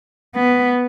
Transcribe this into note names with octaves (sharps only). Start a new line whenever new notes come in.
B3